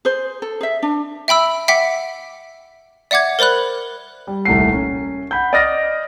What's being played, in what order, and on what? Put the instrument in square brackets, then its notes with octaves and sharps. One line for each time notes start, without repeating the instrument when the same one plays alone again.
[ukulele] G#4 C5
A4
G#4 E5
D4
[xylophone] E5 G5 B5 E6
E5 F#5 G5 D6 B6
D5 E5 F#5 D6 G#6
A#4 C5 D5 B5 F#6
[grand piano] G3
D#1 C2 A3 F#5 C7
C#4
F#5 B5 G6
D5 D#5 D#6 F6 A6 A#6